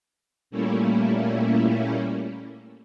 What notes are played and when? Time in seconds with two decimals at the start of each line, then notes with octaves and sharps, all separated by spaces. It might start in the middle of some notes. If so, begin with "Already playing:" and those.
0.51 A#2 G3 A3 A#3 C#4 E4